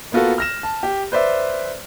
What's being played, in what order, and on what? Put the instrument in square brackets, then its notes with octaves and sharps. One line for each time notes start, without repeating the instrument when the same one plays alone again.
[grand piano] A#3 B3 F4 F#4 A4
F6 A#6 E7
A5
G4
B4 C5 D5 E5